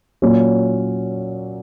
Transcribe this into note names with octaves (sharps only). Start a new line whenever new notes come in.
A#2 F#3 C#4